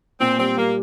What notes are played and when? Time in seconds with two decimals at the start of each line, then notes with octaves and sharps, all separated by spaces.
0.19 A#2 C4
0.38 G3 C4
0.56 G3 A#3